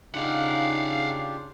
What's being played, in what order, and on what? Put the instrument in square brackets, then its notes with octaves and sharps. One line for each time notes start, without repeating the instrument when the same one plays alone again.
[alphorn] C#3 [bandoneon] D4 F4 G4 [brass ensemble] D#4 [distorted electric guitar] F5 F#5